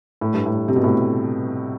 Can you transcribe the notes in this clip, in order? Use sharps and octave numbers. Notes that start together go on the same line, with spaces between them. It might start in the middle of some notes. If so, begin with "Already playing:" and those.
A2
G2
A2
C3
B2
A2